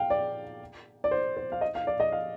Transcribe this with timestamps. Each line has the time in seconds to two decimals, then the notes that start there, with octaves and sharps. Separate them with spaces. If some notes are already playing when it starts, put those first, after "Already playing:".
Already playing: F5 G5
0.10 D5
1.04 D5
1.11 C5
1.37 C5
1.52 F5
1.61 D#5
1.75 F5
1.87 D5
2.00 D#5
2.12 F5